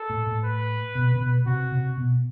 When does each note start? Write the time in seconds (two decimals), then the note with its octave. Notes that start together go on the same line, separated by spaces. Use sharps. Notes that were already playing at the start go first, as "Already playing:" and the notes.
Already playing: A4
0.10 A2
0.27 A2
0.44 B4
0.95 B2
1.15 C3
1.20 B2
1.46 C3 F#4
1.72 C3
1.97 B2